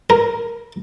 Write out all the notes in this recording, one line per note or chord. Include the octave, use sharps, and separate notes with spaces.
A#4